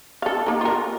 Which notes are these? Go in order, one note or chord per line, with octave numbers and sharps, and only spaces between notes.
A4 F5
A#3 D#4
F4 A#4